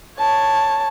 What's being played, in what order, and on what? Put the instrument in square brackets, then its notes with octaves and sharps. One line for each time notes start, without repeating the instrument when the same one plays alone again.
[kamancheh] C#5 A5